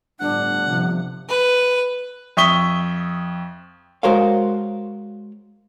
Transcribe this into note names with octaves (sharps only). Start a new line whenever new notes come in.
G1 A2 D4 F#5
C3 F3
B4
F2 E5 C#6 D#6 B6 G7
G#3 F#4 A#4 C5 C#5 F5